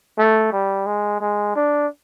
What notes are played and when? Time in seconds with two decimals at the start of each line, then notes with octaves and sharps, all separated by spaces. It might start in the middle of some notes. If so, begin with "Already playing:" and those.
0.18 A3
0.53 G3
0.87 G#3
1.21 G#3
1.56 D4